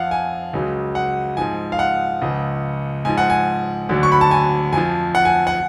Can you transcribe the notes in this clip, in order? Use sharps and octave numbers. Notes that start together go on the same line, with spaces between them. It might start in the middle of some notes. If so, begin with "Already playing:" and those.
Already playing: F2 F3 F5 F#5
G#5
C#2 C#3 F#3
F#5
G#2 F3 G#5
F5
F#5
C#2 C#3 F3
G#2 F3 G#5
F#5
G#5
D2 D3 F#3
C#6
B5
A5
G#5
F2 F3 G#5
F#5
G#5
F#5